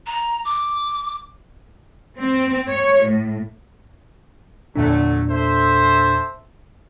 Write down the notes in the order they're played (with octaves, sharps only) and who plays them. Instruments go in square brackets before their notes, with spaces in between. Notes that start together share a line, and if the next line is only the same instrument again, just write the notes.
[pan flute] A#5
D6
[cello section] C4
C#5
A2
[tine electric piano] E2 A#2 D4 [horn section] D3 F#3 A3
[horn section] A4 C5 E5